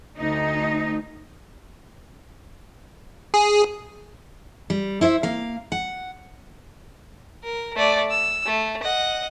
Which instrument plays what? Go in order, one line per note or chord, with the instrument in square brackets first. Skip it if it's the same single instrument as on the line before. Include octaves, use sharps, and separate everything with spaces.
[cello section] D2 D#4
[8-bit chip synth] G#4
[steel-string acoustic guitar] G3
E4 C5 C#5 E5
A#3 F5
F#5
[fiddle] A#4
A3 D5
E6
A3
D#5 F#5